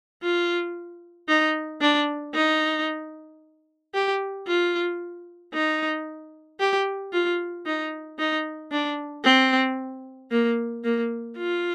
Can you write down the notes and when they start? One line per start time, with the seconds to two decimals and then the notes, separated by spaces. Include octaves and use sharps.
0.22 F4
1.28 D#4
1.81 D4
2.34 D#4
3.94 G4
4.47 F4
5.53 D#4
6.60 G4
7.12 F4
7.66 D#4
8.19 D#4
8.71 D4
9.24 C4
10.31 A#3
10.84 A#3
11.37 F4